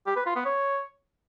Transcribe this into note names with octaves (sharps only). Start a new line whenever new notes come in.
G4
B4
F4
B3
C#5